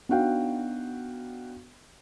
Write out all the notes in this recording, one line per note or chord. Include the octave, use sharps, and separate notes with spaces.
B3 D4 D#4 F#4 F5 G5